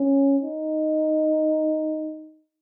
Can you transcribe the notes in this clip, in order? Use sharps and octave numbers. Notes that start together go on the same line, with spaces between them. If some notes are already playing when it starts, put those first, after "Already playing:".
Already playing: C#4
D#4